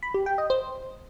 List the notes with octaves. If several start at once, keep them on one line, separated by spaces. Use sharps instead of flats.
B5
G4
G5
D#5
C5